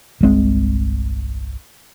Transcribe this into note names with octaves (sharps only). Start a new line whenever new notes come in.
G1 C2 G#3 C4